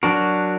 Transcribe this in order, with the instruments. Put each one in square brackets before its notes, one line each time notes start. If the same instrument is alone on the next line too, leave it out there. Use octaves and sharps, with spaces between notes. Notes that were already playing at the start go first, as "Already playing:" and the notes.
[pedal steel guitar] F#3 D4 F#4 A#4